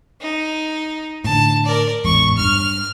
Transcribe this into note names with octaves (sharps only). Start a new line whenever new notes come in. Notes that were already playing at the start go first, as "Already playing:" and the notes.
D#4
A2 D3 A5
A#4 D5
A1 E2 G#2 C#6
G2 F6